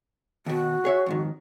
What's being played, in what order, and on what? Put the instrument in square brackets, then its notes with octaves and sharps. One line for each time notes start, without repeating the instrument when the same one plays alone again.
[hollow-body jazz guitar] D#2 B2 [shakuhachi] F#4
[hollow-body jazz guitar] G#4 C#5 E5
F2 G#2 D#3